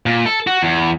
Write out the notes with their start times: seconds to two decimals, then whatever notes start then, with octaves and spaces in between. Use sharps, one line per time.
0.06 A#2
0.26 A4
0.47 F#4
0.63 E2